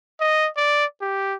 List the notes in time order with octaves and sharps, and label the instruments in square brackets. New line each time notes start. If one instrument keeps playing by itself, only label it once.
[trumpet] D#5
D5
G4